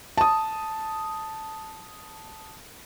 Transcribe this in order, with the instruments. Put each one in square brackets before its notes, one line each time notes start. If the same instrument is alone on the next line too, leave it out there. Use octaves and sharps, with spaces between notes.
[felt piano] A5 D#6